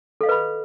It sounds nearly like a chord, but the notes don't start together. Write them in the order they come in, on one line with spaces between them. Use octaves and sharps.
A4 F5 D#5 B4 B5